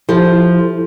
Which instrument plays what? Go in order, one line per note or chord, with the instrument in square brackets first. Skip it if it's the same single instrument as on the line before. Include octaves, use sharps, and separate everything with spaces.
[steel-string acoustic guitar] F3 [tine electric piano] E4 G4 A4